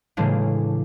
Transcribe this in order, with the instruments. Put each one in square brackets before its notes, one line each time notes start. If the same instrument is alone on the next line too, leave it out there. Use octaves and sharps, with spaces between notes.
[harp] A2 C#3 E3 G#3 A#3 D4